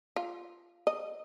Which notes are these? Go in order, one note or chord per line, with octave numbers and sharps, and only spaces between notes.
F4
D#5